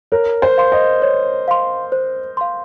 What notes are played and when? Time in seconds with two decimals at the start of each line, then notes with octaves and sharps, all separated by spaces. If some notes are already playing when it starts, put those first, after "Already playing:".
0.12 A#4 C#5
0.42 C5
0.58 F5 C6
0.72 D#5
1.02 C#5
1.48 F5 C6
1.92 C5
2.37 F5 C6